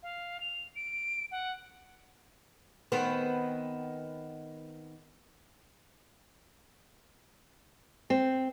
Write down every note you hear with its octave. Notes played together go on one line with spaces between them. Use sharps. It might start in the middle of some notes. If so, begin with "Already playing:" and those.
F5
F7
D7
F#5
D#3 B3 C4
C4